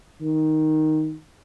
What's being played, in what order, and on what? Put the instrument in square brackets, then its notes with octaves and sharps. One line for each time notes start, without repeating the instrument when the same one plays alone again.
[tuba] D#3